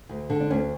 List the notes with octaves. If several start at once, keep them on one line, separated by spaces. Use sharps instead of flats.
D2
D3
D4
D2 C#4